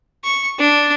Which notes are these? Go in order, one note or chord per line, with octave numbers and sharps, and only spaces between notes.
C#6
D4